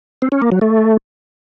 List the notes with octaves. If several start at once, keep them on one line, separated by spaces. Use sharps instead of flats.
C4
C#4
A#3
F#3
A3